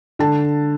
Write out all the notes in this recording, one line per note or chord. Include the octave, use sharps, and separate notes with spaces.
D3 A5